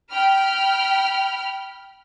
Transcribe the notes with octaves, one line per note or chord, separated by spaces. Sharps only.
G5 B5 F6